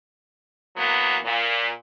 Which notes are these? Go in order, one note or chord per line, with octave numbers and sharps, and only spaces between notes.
E3 F#3 A#3 B3
A#2